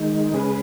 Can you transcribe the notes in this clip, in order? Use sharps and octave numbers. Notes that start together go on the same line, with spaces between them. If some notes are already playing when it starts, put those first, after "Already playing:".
Already playing: D#3 G#3 D#4
C#3 G#3 C#4 G#4 B4